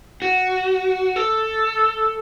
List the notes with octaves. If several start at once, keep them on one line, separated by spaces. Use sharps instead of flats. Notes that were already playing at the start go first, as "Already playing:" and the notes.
F#4
A4